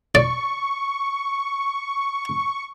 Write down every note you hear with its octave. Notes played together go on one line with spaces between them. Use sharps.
D5 C#6